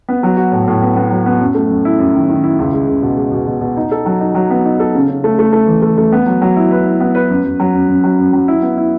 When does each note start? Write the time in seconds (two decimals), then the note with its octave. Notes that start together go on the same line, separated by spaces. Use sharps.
0.09 B3
0.23 F#3
0.37 F#4
0.52 A2
0.67 A2
0.82 B3
0.96 B3
1.11 F#3
1.26 B3
1.41 F#2
1.55 A3
1.70 F#2
1.85 E4
1.99 F#2
2.15 D#3
2.30 D#3
2.44 E4
2.59 C#2
2.73 G#3
2.88 C#2
3.02 B2
3.17 G#3
3.32 B2
3.47 B2
3.61 B2
3.77 D#4
3.91 A4
4.06 F#3
4.20 D#4
4.35 F#3
4.50 B3
4.65 D#4
4.79 A4
4.95 C#3
5.08 C#3
5.24 A3
5.39 A3
5.53 A3
5.67 E3
5.82 A3
5.98 A3
6.12 B3
6.26 F#3
6.42 F#3
6.56 E4
6.71 B4
6.86 E4
7.00 B3
7.15 B4
7.30 F#2
7.44 F#2
7.60 F#3
7.74 F#2
7.88 F#2
8.04 F#3
8.19 F#2
8.33 F#3
8.48 E4
8.62 B3
8.77 E4